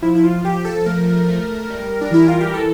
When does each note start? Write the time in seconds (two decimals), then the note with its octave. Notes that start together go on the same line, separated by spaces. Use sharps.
0.02 F3 E4
0.15 E4
0.24 F4
0.44 F3 G4
0.65 A4
0.86 A3 A#4
1.28 A3
1.70 G3
2.01 D4
2.11 E3 E4
2.28 F4
2.40 G4
2.53 A4